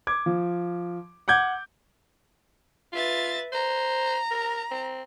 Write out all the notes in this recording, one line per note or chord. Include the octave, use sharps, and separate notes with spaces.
D6 G#6
F3
F#5 D6 G6 G#6
F4 B4 E5 A6
C5 A#5
A#4
C4